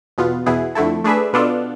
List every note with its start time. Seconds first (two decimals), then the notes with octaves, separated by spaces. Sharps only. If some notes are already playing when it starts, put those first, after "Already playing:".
0.18 E2 B2 B3 F4
0.46 E2 B2 B3 E4 G#4
0.75 F2 D3 A3 E4 A4
1.04 A3 D4 G#4 B4 E5
1.33 B2 B3 D4 F4 A4